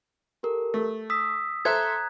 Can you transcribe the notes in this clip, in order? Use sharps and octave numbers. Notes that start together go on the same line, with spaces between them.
G4 A4 A#4
A3
D#6 E6 B6
A4 C5 E5 A#5 F#6 G#6